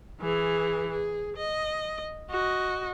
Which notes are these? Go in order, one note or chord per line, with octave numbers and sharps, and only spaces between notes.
E3 G#4
G#4
D#5
F#4 D#5